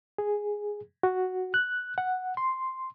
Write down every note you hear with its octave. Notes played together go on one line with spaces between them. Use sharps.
G#4
F#4
F#6
F#5
C6